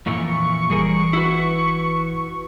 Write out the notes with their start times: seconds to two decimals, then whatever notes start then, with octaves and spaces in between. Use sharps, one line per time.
0.06 F2 A#2 E3 C#6
0.70 G1 E3 G3 G#4 A#4
1.13 E4 F#4 B4